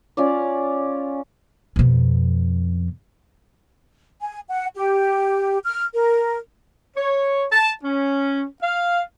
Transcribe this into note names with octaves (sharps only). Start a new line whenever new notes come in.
C#4 F4 D5
F2 B2
G#5
F#5
G4
F6
A#4
C#5
A5
C#4
F5